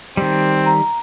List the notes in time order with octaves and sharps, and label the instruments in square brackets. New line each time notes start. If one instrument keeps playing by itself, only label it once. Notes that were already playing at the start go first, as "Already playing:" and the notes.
[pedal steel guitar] D#3 G3 [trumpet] C4
[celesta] A#5